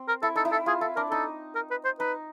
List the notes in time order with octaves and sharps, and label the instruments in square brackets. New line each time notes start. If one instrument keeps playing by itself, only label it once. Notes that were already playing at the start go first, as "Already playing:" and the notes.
Already playing: [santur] C4
[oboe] A#4
[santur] E4 [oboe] A4
[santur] D#4 [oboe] A4
[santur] E4
[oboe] A4
[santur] F4 [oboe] G#4
[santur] E4 [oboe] A4
[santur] D4 [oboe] A#4
[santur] D#4 [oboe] A4
[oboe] A#4
B4
C5
[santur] D#4 [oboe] B4